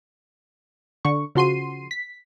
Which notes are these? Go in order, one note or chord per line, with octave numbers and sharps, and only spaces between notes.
D3 C#6
C#3 F3 F#4 C6 C7 D#7
B6